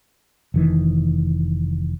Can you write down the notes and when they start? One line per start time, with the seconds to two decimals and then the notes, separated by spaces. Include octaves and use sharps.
0.54 F1 D#3 E3